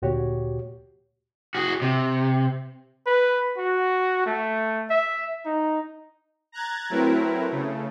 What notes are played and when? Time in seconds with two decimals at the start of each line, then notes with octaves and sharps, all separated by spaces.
0.02 D2 A#2 F#4 G4 C#5
1.55 F#4 G#4
1.82 C3
3.06 B4
3.57 F#4
4.26 A3
4.90 E5
5.45 D#4
6.52 A#5 F#6 G#6 A6
6.90 F#3 A3 C4 E4 A#4 B4
7.50 C#3 A3